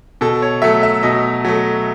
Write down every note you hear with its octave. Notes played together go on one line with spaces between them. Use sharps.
B2 A4
C#5
F#3 A3 E5
E5
B2 D#5
F#3 A3